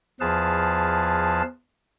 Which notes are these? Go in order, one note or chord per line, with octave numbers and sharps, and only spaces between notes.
E2 F3 G#4 B4 F5 A5